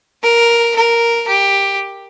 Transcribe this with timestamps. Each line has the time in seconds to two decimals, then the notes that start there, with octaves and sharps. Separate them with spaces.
0.23 A#4
0.76 A#4
1.28 G4